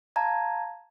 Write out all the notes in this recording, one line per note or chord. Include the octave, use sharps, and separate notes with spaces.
F5 A5 A#5 G#6